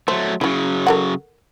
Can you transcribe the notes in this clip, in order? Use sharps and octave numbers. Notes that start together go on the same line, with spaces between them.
F#3 A3 C5
C#3 F#3 C#4 E4
A4 A#4 F#5